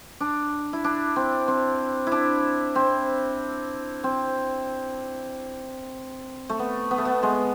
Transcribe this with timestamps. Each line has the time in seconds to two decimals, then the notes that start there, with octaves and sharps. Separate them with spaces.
0.20 D4
0.73 E4
0.84 D4
1.16 C4
1.48 C4
2.07 E4
2.12 D4
2.76 C4
4.04 C4
6.49 A3
6.59 B3
6.91 B3
6.98 A3
7.05 B3
7.23 G#3